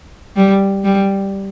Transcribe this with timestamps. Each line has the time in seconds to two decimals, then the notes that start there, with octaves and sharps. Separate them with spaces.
0.36 G3
0.84 G3